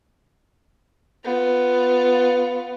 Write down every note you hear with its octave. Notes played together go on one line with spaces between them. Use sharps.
B3 F4